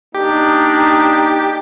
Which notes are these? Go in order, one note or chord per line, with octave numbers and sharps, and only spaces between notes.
A#3 D4 D#4 G4